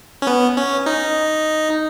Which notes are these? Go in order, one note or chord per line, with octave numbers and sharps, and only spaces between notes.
C#4
B3
C#4
D#4